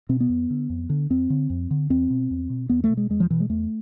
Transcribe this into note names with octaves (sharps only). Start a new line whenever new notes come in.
B2 C4
B3
F2
D3
F2
D3
F2 C4
D3
F2
D3
E2 C4
B2
E2
B2
E2 B3
A3
B2
G#3
E2 G#3
F3
B2 E3
G#3
E2 A3